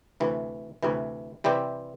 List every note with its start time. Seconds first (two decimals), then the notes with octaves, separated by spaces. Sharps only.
0.20 D2 C3 E3
0.83 D2 C3 E3
1.44 C3 E3 G3 C4 G4